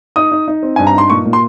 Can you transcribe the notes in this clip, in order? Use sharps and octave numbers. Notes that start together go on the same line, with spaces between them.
D#4 D#6
D#4
D#4
C4
G2 G#5
A#5
D#4 C6
A#2 C#6
A#2
C6